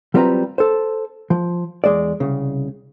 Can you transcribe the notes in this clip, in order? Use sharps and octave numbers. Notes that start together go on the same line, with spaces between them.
F#3 G3 C4 F4 B4 A#5
A4 C5
F3
E2 G#3 D5
C2 C#3